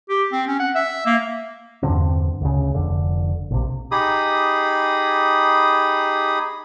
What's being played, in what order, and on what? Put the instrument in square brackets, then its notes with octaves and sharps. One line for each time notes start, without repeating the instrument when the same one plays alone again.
[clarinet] G4
C4
C#4
F#5
E5
A#3
[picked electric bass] E2 G2 D3 C4
D2 C#3
F1 D3
A#1 C3
[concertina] D#4 G4 G#4 B5 D#6